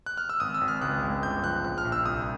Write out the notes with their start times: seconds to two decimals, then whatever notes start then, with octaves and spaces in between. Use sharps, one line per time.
0.06 F#6
0.17 F6
0.29 E6
0.40 G#1 D#6
0.54 E6
0.61 G#1
0.68 F6
0.81 C#2 F#6
1.02 C#2
1.23 G1 G6
1.44 F3 F#6
1.64 A#1 F#6
1.78 F6
1.85 A#1
1.92 E6
2.05 C2 D#6